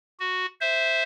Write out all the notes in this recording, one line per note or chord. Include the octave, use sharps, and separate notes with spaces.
F#4
C5 E5